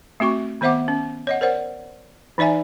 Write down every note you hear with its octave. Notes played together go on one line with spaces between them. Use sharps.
A3 C4 F#4 C#6
D#3 B3 C5 E5 F#5 D6
C#4
C#5 D#5 F#5
A#4 C5 D5 F#5
E3 D#4 D5 E5 G#5